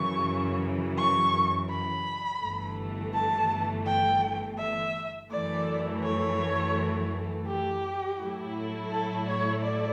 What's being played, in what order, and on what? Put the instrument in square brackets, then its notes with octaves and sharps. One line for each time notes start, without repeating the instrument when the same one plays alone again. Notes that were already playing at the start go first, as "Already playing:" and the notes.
Already playing: [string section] F#2 C#3 E3 [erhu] C#6
[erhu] C#6
B5
[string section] G1 G2 E3 A3
[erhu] A5
G5
E5
[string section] F#2 E3 A3 [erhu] D5
[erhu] C#5
G4
[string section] A2 F#3 A3 E4
[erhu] A4
C#5
D5